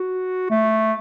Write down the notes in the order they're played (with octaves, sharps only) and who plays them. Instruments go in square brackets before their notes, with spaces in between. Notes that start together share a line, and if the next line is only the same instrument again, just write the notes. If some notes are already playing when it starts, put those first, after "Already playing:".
Already playing: [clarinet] F#4
A3